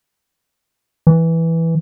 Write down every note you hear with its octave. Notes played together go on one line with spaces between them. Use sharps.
E3